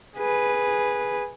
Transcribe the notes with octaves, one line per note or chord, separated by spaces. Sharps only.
G#4 B4